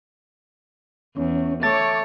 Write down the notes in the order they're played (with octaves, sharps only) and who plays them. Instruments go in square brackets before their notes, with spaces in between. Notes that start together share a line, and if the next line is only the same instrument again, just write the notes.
[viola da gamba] E2 [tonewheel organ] C#4
[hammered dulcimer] A3 [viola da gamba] C#5 [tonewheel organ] D6 [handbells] A6